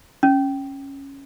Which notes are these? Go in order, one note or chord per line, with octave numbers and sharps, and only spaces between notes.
C#4